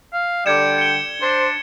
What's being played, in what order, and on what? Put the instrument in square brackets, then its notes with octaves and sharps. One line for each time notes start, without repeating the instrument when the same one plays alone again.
[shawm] F5
[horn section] D3 G3 D5 [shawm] G5 [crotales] G#6 C#7 E7
[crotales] C#7 G7
[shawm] D4 [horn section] C5